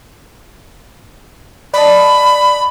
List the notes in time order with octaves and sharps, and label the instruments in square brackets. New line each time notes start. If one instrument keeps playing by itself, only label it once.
[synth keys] D5 D#5 A5 [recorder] B5